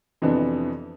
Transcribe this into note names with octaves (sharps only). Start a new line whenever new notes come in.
F2 C3 E3 B3 D4